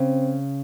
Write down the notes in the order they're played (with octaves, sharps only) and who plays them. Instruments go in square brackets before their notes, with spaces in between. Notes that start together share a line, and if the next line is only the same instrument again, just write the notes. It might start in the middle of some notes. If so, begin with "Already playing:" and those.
Already playing: [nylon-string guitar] C#3 [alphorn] C4